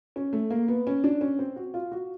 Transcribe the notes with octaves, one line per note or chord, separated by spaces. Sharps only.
C#4
A3
A#3
B3
C#4
D4
C#4
C4
F#4
F4
F#4